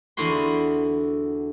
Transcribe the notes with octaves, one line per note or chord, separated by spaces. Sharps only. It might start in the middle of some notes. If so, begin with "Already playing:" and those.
E2 D3 E4 F#4 C6